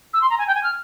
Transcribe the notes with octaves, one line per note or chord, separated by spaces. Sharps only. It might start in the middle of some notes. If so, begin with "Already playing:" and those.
E6
C6
A#5
G#5
G5
G#5
F6